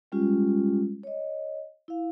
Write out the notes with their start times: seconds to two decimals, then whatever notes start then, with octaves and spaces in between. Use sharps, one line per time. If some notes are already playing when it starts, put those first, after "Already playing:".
0.12 G3 G#3 C#4 F4 G4
1.03 C#5 D#5
1.88 E4 F5